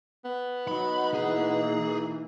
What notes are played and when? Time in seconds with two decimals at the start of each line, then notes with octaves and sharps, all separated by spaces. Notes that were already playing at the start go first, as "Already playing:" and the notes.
0.25 B3
0.68 F#3 D#4 B5
1.14 B2 E3 A#3 G#4